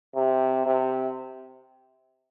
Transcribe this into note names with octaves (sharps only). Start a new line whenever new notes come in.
C3
C3